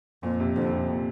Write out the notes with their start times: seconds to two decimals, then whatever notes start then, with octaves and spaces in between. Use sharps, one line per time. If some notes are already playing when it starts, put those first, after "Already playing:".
0.23 F2 A#2
0.40 C3
0.56 F2 D3
0.72 C3
0.89 A#2